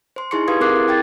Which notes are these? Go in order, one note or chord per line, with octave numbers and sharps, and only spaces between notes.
C5 C6
D#4 E4 G#4 C6 C#6 C#7
G4 B4 F5 C6 D#6 G#6
C4 G#4 A#4 D6 F#6 C7
E4
E4 G5 G#6 A6